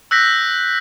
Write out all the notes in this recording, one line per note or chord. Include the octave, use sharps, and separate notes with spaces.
E6 F#6 G6 A#6 B6